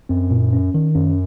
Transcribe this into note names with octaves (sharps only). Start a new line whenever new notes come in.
F#2 C4
A#2
C#4
D#3
F#2 C#4